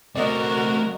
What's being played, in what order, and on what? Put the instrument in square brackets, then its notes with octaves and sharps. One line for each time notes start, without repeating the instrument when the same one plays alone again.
[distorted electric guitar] A3 C4 [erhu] F#4 [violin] A#4 [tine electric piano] D5 D#5